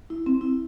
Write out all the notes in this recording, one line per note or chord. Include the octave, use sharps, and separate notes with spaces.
E4
C4
E4